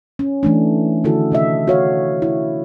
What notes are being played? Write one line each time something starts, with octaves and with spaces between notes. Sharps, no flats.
C#4
E3 A3 D4
D3 D#3 A3 E4 F#4 A4
C3 D#5 E5
F#4 C#5 F5
E4